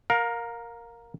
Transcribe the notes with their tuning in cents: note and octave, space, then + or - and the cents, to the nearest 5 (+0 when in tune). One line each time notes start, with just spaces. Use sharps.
A#4 +0 F5 +25